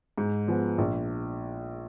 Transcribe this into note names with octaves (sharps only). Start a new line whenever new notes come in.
G#2
F3 G#3 B3
A#1